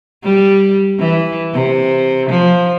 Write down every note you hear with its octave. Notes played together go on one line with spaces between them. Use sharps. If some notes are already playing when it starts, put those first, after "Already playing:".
G3
E3
C3
F3